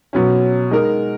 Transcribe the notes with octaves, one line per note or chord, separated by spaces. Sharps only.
B2 F#3 C#4
G#3 D#4 A#4